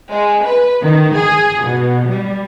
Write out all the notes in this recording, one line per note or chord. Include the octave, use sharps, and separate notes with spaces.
G#3
B4
D#3
G#4
B2
G3